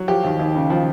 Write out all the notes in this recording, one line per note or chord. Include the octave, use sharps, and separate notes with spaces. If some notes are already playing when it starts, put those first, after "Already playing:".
Already playing: F#3
F3 G4
D#2
D#2
C#3
F3